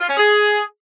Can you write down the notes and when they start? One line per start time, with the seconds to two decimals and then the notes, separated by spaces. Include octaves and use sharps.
0.01 F4
0.09 C#4
0.18 G#4